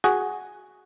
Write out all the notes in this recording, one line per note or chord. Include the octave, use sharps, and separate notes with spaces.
F#4 G#4